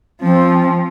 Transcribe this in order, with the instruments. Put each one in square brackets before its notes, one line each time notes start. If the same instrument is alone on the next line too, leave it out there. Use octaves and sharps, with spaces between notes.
[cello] F3 [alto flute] C4